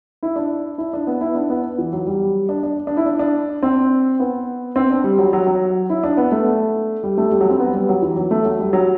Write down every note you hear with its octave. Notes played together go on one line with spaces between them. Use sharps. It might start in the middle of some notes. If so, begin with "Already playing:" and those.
E4
D4
E4
D4
B3
E4
D4
B3
E3
F#3
G3
D4
D4
D4
E4
D4
D4
C4
B3
C4
D4
G3
F#3
F#3
F#3
E4
D4
B3
A3
G3
A3
G3
F#3
C4
B3
G3
F#3
E3
F#3
A3
F#3
G3
F#3